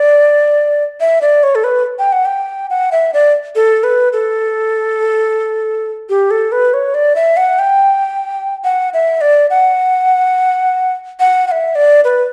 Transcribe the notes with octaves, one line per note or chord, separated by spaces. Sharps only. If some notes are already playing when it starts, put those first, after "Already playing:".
Already playing: D5
E5
D5
C#5
A4
B4
G5
F#5
G5
F#5
E5
D5
A4
B4
A4
G4
A4
B4
C#5
D5
E5
F#5
G5
F#5
E5
D5
F#5
F#5
F#5
E5
D5
B4